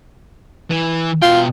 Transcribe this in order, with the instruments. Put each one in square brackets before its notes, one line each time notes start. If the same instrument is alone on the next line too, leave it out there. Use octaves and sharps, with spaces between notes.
[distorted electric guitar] E3
[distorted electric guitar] B2 G5 [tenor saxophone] F4